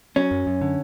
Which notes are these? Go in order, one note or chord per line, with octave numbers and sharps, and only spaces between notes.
F#3 C#4
F#2
F#2
D3